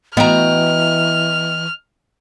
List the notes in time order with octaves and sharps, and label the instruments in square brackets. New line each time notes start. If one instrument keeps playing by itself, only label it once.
[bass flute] E3 [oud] B3 F#4 [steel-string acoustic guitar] D#5 G5 A#5 [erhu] F6